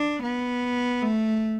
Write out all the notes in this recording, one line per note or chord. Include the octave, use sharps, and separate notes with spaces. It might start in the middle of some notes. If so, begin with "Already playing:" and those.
Already playing: D4
B3
A3